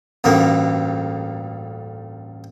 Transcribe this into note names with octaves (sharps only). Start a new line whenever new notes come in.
A1 D2 G2 A#3